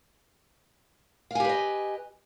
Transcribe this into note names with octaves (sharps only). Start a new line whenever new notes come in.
G4 B4 D#5 F5 G#5